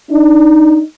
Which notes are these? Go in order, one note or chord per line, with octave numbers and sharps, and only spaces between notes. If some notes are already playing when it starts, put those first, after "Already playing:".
D4 D#4